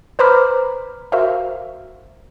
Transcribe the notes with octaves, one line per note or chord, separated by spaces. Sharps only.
B4 C5 A#5 B5 D6 F6
F#4 A#4 C5 E5 F5